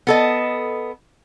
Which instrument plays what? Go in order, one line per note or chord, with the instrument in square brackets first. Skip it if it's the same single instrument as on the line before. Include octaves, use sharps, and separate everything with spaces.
[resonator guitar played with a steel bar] B3 A4 D#5